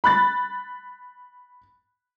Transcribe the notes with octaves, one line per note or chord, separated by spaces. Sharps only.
B5 F#6 A6